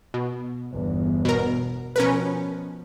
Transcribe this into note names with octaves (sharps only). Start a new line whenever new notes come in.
B2
G1 E2
B2 A#4
B2 F3 C#4 A#4 B4